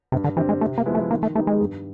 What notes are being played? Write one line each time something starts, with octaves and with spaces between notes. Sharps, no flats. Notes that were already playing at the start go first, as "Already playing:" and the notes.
G2 C3
D3
D3 E3 G3 C4
G#3
C3 A3
A#3
F3 G#3 B3 E4
A3
D#3 A#3
A3
G3 A3 B3 D#4
G#3
G2